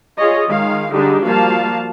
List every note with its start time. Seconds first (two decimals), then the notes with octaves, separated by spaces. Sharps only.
0.17 F4 G#4 C#5 D#5
0.48 D#3 G#3 F5
0.92 D3 G3 G#3 D4 D#4 G4
1.24 F3 G3 A#3 F#4 F5 A5